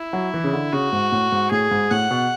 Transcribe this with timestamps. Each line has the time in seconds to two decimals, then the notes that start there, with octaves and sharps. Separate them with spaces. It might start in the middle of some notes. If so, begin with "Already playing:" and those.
Already playing: E4
0.13 F#3
0.34 E3
0.44 C#3
0.53 D3
0.73 C#3 F#4
0.93 G#2
1.12 A2
1.32 G#2
1.52 A2 G#4
1.71 G#2
1.91 A2 F#5
2.11 B2